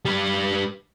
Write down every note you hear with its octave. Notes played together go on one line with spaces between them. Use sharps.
G3 B4